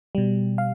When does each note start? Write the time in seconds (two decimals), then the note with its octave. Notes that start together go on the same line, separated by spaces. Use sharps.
0.15 B2 G3
0.58 F5